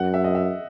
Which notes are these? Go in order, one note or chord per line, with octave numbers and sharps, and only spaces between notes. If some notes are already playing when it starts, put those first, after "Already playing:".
Already playing: F#2 F#5
E5
D#5
E5